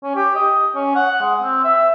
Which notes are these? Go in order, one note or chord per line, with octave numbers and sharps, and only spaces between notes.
C#4
G4
D#5
C#4
F#5
G#3
C4
E5